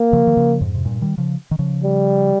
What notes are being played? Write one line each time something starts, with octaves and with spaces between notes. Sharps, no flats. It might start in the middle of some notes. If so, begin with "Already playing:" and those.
Already playing: A#3
C#3 F3
D#3
C#3 F3
F2 G#2
C3
G2 A#2
D#3 G3
C#3 F3
D#3
C#3 F3
G3